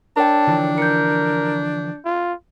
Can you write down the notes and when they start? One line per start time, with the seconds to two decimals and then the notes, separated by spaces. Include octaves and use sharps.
0.17 D4 A#4 C#5 G5 A5
0.47 D3 E3 F3
0.78 A#4 G6 C#7
2.05 F4